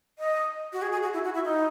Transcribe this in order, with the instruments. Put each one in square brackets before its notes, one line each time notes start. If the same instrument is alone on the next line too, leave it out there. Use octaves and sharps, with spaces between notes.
[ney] D#5
F#4
G#4
G#4
F#4
E4
F#4
E4
D#4